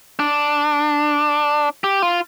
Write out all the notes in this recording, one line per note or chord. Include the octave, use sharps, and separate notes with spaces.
D4
G4
F4